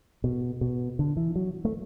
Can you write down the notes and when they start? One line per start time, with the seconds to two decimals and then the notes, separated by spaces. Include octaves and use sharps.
0.24 B2
0.61 B2
0.99 D3
1.17 E3
1.36 F#3
1.65 A3